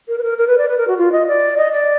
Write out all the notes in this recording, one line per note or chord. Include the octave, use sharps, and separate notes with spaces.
A#4
B4
A#4
A#4
B4
D5
B4
A#4
F#4
F4
D#5
D5
D#5
D5